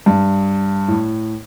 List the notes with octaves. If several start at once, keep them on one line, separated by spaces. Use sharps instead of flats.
G2
A2